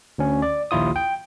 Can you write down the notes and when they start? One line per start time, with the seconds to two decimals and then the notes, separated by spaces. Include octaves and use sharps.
0.18 D2 C#4
0.42 D5
0.71 A#1 D#2 E4 F4 D#6
0.96 G5